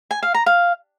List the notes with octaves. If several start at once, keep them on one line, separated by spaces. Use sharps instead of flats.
G#5
F5
A#5
F5